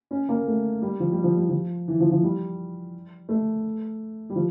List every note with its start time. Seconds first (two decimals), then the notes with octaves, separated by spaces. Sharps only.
0.11 C#4
0.29 A#3
0.47 A3
0.82 G3
1.00 F3
1.12 G3
1.24 F3
1.36 G3
1.49 F3
1.88 E3
2.00 F3
2.11 F3
2.23 G3
3.29 A3
4.30 G3
4.36 F3